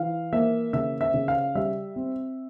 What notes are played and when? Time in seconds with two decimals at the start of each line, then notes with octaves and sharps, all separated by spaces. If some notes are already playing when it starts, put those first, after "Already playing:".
Already playing: E3 F5
0.33 A#3 E5
0.73 C#3 E5
1.01 E5
1.14 C#3
1.28 F5
1.55 G3 E5
1.96 C4